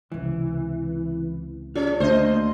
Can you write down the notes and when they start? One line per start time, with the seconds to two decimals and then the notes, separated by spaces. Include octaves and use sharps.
0.12 C#2 C3 E3
1.76 C#4 F4 G#4 C#5
2.00 D2 A#3 C5 D#5